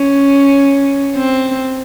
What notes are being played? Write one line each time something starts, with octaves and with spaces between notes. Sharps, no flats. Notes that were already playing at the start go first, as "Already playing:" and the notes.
Already playing: C#4
C4